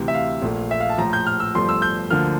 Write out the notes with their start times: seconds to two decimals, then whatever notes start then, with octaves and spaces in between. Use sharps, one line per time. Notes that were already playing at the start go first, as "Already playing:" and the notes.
Already playing: D2 C3 E3
0.08 E5
0.14 F5
0.42 A#1 A#2 A3
0.71 E5
0.80 F5
0.89 A5
0.98 A#1 A2 F3 A#5
1.13 G6
1.27 F6
1.40 E6
1.55 G1 G2 F3 A3 C6
1.69 E6
1.82 G6
2.10 D2 D3 F3 A#3 F6